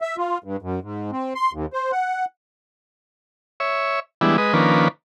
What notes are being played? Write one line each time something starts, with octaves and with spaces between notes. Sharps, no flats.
E5
F4
G2
F#2
G#2
C4
C6
D#2
C5
F#5
C#5 E5
E3 G3 G#3 B3 D4 E4
G#3 B4 D#5
D#3 F3 A#3 C#4 D4 B4